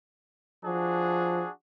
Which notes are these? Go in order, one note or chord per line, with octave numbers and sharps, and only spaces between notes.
F3 D4 F#4 G#4